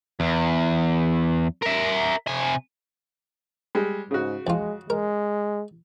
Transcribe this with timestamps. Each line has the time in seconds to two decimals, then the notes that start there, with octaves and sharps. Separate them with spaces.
0.20 E2
1.63 A#4 E5
2.27 C3 G#5
3.75 G3 G#3
4.11 G#2 C#3 F#4
4.47 F2 G#3 F4
4.90 G#3 A#4